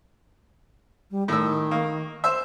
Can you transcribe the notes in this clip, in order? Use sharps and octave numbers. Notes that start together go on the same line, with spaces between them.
G3
A2 D#3 E6
A#3
C5 E5